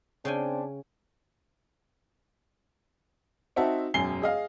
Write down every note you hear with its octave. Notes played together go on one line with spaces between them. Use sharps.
C#3 C4 D4 G5 G#5
C4 D#4 F#4 E5 A5
E1 F#2 G#5 C7 G7
G#4 D#5 F5